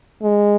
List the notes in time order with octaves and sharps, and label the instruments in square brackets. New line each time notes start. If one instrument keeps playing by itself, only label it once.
[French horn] G#3